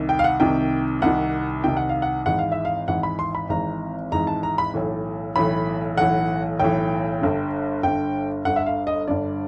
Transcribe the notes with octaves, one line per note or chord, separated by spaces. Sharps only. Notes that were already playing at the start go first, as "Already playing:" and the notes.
Already playing: C2 C3 D#3
G5
F5
F#5
C2 C3 D#3 G5
C2 C3 D#3 F#5
C2 C3 D#3 G5
F#5
F5
F#5
G#1 G#2 E3 F#5
F5
E5
F5
G#1 G#2 E3 F#5
B5
C6
B5
G#1 G#2 E3 A#5
G#1 G#2 E3 A#5
A5
A#5
B5
B1 A2 E3
B1 A2 E3 B5
B1 A2 E3 F#5
B1 A2 E3 G5
G1 G2 D3
G1 G2 D3 G5
G1 G2 D3 F#5
E5
F5
D#5
G1 G2 D3 D5